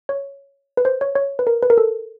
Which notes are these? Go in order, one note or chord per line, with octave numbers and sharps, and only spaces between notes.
C#5
B4
C5
C#5
C#5
B4
A#4
B4
A#4
A4